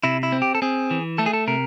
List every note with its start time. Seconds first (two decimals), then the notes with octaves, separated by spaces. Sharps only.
0.04 C3 E4
0.23 E4
0.32 C4
0.42 G4
0.55 A4
0.62 C4 G#4
0.91 E3
1.18 A3 A4
1.26 G#4
1.33 A4
1.47 C3 A#4